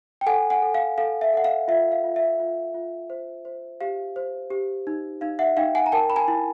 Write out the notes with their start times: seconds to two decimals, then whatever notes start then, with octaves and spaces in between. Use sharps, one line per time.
0.21 G5
0.26 A4 F#5 G#5
0.50 F#5 G#5
0.62 A4
0.74 F5
0.98 A4 F5
1.21 E5
1.34 A4 F#5
1.44 F5
1.68 F4 E5
1.92 F5
2.04 F4
2.16 E5
2.40 F4
2.74 F4
3.10 C5
3.45 C5
3.81 G4 F5
4.16 C5
4.50 G4
4.87 D#4
5.21 D#4 F5
5.39 E5 F#5
5.57 D#4 F5 G5
5.75 F#5 G#5
5.86 A#5
5.92 A#4 G5 A5
6.10 B5
6.16 G#5 A#5
6.28 E4